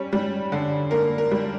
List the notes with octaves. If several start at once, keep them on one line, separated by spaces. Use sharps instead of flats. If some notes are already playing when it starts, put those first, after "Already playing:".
Already playing: G3 C#4
G3
D3
A#3 A#4
A#4
G3